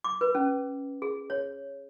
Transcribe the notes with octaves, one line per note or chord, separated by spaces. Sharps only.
D6
B4
C#4
G#4
C#5